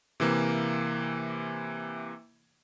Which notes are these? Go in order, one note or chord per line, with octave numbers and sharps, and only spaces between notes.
C3 E3 A#3